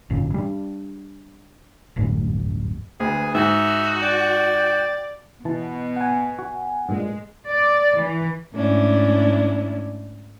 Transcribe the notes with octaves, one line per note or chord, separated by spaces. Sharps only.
G1 F#2 A#2
G3 D4
D1 G1 F#2 A2
D2 G#4 B4
G#2 D#4 F#4 E5
D5 G5
B2 E3 A5
F#5 G#5
F#4
G2 A#2 G#3
D5
E3
G#2 A3 C#4 D4 E4